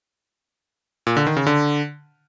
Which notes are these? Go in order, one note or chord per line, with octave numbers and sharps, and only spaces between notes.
A#2
D3
D#3
C#3
D3